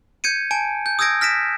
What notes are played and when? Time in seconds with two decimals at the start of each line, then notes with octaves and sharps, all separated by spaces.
0.24 G6 G#6 C#7 D#7
0.51 G#5 A5 D7
0.86 G6
0.99 D#6 E6 G6 G#6 A#6 D7
1.21 F6 A#6 B6 D7 E7